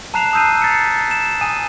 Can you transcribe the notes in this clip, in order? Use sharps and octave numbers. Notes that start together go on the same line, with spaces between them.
A5 A#5 F#6 C7 E7 F7
D#6 E6 G6 C7 D#7
A6 B6 C#7
E7
G#5 D#6 D#7